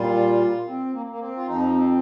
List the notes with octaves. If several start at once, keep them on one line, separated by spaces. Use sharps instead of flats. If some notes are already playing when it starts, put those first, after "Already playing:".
Already playing: A#2 G3 F4
C4
A#3
A#3
C4
F4
F2 F3 D#4
C4